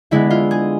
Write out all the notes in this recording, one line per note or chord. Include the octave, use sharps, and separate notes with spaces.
D3 G#3 B3 E4
F4
G#4